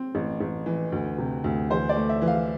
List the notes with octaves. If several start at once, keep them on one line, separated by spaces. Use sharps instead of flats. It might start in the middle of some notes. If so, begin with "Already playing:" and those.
Already playing: C4
A1
A1
E3
D2
C3
D2
E3 C5
D5
A3
E5
E3
F5